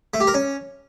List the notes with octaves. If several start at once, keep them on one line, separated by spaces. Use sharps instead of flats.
A3
G4
A#4
C#4